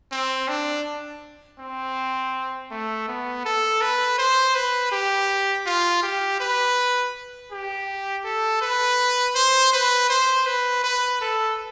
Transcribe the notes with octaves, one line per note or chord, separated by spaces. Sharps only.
C4
D4
C4
A3
B3
A4
B4
C5
B4
G4
F4
G4
B4
G4
A4
B4
C5
B4
C5
B4
B4
A4